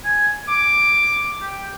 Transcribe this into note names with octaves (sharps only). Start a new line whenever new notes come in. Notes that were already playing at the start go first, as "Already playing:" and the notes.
G#5
D6
G4